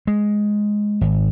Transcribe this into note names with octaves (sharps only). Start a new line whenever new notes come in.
G#3
G#1